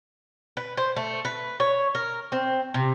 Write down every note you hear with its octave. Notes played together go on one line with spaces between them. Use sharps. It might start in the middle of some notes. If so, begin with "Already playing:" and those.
B4
C5
A3
B4
C#5
A#4
C4
C3